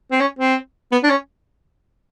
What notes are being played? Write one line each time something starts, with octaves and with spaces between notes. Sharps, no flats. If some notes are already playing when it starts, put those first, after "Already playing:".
C4
C#4
C4
B3
D4
C#4